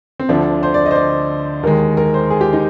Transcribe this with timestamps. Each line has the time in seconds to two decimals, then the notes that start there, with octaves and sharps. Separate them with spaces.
0.20 C4
0.29 D2 D3 F3 D4
0.63 C5
0.74 D5
0.86 D#5
0.91 C5
0.96 D5
1.63 D#2 D#3 G#3 A#4
1.97 A#4
2.14 C5
2.30 G#4
2.41 G4
2.53 D#4